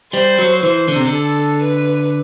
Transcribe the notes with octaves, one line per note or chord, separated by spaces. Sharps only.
G3 C5
F#3
E3 C5
D3
C3
D3
A4
B4